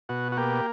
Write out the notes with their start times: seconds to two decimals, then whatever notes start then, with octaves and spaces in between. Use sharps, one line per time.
0.09 B2 F#4
0.32 F#4
0.37 A#3 G4